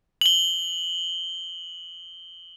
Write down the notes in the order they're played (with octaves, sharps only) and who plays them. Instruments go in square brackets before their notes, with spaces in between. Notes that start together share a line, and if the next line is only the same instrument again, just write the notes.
[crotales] F#7 G7